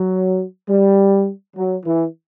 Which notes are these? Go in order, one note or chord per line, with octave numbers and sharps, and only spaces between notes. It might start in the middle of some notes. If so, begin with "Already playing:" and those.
Already playing: F#3
G3
F#3
E3